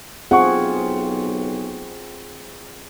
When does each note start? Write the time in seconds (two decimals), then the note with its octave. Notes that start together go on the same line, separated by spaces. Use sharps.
0.31 B1 C4 F4 G#4 F#5 C#6